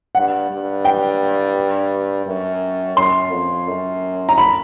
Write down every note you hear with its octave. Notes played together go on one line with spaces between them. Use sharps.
G2 F#5
G2
G5
F#2
F#2 C6
F2
F#2
A#5
B5